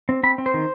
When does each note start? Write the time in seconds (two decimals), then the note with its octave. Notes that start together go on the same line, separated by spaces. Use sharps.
0.09 C4
0.23 C4 B5
0.38 C4
0.46 C5
0.54 D#3